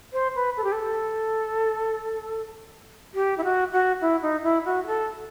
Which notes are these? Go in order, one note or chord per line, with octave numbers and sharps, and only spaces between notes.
C5
B4
A4
G4
A4
G4
E4
F#4
F#4
E4
D#4
E4
F#4
G4
A4